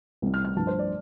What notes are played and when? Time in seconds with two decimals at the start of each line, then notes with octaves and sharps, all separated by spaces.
0.22 C2 C3 G3
0.34 F6
0.45 F6
0.57 G2 F3 A5
0.67 C5
0.79 D5